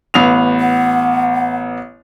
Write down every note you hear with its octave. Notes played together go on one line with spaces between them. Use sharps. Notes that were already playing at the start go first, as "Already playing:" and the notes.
A1 B3 F7
F#5